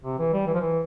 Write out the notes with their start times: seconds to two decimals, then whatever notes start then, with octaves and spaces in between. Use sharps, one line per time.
0.04 C3
0.18 E3
0.33 G3
0.47 E3
0.54 F3
0.61 E3